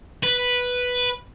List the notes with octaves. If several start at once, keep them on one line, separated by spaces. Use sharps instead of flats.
B4